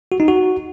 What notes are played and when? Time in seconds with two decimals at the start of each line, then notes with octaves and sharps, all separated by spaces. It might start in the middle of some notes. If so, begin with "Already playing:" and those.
0.12 F#4
0.20 D#4
0.28 F#4